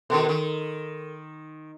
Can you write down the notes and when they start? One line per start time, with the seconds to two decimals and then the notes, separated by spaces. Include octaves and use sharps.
0.10 B2 D#3 A4 A#4
0.29 D#3